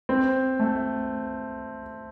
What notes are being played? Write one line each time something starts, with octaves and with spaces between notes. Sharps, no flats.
C4
A3